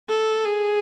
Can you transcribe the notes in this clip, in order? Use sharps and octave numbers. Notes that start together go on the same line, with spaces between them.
A4
G#4